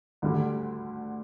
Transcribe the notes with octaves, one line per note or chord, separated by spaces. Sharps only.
D2 D3 G3